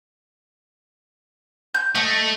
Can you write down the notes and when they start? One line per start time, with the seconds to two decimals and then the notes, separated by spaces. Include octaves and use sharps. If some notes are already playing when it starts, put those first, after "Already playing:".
1.74 G6
1.95 A3 D#5